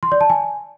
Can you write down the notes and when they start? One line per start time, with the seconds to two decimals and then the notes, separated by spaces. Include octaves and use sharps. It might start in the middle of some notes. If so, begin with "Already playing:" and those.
0.03 C6
0.12 D5
0.21 A5
0.30 G#5